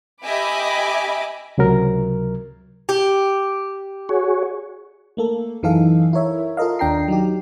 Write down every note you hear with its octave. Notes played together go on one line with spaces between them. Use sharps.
G4 D#5 E5 G#5 B5 D6
C#2 C3 F#3 A#4
G4
F#4 G#4 C#5
A3 A#3 A4
F#2 E3 D#4 G#4 A4 F5
E4 A#4 C#5 E5
F4 A4 A#4 D#5 F5
D#2 D4 G5 A#5 C7
F#3 D#4 G4